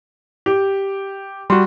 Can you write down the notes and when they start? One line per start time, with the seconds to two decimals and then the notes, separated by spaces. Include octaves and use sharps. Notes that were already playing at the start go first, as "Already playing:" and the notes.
0.46 G4
1.50 G3 F#4 C6